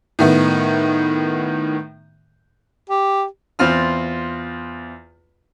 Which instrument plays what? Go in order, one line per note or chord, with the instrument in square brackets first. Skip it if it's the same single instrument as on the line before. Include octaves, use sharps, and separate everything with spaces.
[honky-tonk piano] A2 D#3 B3
[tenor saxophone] G4
[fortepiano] E2 C4 F4 F6